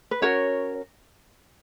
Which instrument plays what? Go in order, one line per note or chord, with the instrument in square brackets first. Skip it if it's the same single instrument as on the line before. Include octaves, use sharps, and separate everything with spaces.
[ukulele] B4
C#4 F#4 A#4 C#5